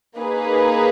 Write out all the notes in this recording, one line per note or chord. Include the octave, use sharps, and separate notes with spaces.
A#3 D#4 G#4 B4